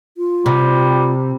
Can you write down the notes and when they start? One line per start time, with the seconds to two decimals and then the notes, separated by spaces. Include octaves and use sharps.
0.17 F4
0.46 C3 G3